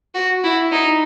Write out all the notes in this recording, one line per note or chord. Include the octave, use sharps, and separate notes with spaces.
F#4
E4
D#4